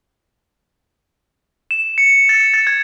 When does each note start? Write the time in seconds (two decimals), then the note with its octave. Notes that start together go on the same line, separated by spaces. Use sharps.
1.71 E7
1.98 C#7
2.29 A6
2.54 A6
2.67 G#6